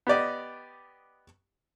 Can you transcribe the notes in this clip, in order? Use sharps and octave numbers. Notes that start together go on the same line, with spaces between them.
B3 G4 D5 D#5